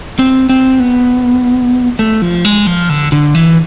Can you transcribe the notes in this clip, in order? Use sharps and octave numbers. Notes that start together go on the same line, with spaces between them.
C4
C4
B3
A3
F3
G#3
F3
D3
D3
E3